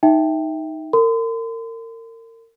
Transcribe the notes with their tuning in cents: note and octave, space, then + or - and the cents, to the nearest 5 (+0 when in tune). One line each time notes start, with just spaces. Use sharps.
D#4 +5 E5 +0 G5 +0
A#4 -35 C6 -40